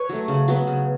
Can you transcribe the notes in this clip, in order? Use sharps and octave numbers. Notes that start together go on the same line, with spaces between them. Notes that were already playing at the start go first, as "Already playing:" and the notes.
Already playing: B4 C#5
F#3 A3
C#3
F#3 B3
C#3